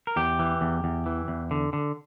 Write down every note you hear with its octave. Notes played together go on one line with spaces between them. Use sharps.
A#4
E2 G4
E3
E2
E2
E3
E2
D3
D3